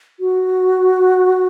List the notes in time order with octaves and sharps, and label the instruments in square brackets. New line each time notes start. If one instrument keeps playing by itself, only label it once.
[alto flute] F#4